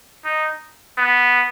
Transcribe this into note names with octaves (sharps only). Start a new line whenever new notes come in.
D#4
B3